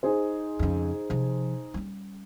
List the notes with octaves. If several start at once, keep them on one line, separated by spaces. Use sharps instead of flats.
D#4 G#4 C5
F2 C#3
C3 F3
G3 C#4